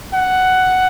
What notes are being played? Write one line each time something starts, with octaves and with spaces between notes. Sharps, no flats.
F#5